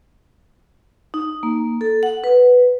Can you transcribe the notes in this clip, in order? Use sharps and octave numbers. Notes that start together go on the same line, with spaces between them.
D#4
A#3
A4
F#5
B4